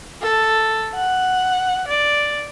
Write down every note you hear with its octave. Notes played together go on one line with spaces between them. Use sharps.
A4
F#5
D5